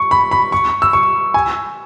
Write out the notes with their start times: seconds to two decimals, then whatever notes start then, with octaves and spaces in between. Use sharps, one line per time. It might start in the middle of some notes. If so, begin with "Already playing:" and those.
Already playing: C#6
0.11 B5
0.31 B5
0.52 C#6
0.82 E6
0.93 C#6
1.34 G#5